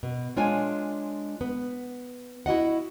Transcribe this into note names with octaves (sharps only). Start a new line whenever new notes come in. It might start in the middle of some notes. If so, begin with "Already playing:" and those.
B2
G#3 D4 F4 C#5 G#5
B3
E4 F#4 D#5 F#5